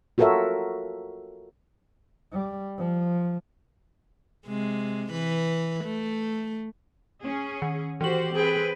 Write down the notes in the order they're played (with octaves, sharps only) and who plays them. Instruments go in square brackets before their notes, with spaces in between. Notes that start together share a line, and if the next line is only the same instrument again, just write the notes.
[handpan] F4 F#4 A4 A#4 C#5 E5
[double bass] G3
F3
[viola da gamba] C3 G#3
E3 B4
A3
[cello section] C#4 G#4
[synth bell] D#3
[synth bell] E3 F#7 [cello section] F#4 G4 C5
[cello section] C4 B4 [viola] G#4 G5